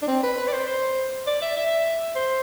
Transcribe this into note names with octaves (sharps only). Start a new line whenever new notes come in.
D4
C4
B4
B4
D5
C5
C5
D5
E5
E5
C5